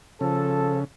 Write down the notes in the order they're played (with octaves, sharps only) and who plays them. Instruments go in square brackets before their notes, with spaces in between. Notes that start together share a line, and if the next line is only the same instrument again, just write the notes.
[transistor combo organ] C#3 [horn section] F3 A4